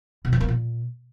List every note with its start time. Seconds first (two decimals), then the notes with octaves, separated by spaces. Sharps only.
0.25 B2
0.33 F3
0.40 A#3
0.48 A#2